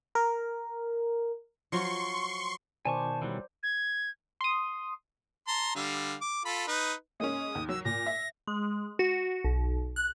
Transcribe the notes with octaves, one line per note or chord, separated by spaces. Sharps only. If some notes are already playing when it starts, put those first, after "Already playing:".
A#4
F3 F#3 F4 C6 C#6
B2 D#3 C5 D5 G#5 A5 C#6
E3 F#3 G3
G#6
C6 D#6
A5 A#5 C6
D3 G3 F5
D6
F4 A4 B5
D#4 B4
G#3 A#3 C#4 D#6
D#2
F#3 E6
A#2 A#6
E5
G#3
F#4
B1
F#6